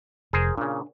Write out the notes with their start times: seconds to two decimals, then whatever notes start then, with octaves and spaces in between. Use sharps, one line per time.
0.33 F1 G#4 A#4 C5
0.57 A#2 C#3 D4